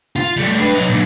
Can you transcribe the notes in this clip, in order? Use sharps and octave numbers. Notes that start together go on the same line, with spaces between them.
F4
G3 A3
D4 B4
F#3 D#4
A#2 F#3